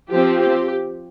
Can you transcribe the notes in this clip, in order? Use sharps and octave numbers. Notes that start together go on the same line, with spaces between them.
F3 C4 G4
G4